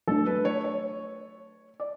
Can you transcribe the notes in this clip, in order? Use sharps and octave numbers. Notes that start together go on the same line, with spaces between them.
F#3 A3 D4 A4
B4
C#5
C#5
D5